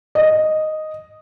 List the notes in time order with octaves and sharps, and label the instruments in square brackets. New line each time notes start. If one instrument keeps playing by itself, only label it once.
[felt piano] D#5